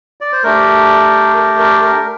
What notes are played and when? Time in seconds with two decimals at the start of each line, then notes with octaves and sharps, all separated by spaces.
0.21 D5
0.32 C5
0.43 A3 D4 G4 A#4
1.36 A#4
1.59 A#4
1.82 A#4